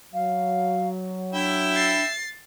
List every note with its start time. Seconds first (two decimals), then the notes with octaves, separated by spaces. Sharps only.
0.14 F#3 F5
1.33 D4 E4 E5 G5
1.75 A6 C7